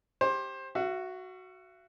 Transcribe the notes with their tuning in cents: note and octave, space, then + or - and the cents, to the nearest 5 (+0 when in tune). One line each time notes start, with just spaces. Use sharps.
G4 +0 C5 +20
F#4 +0 E5 +45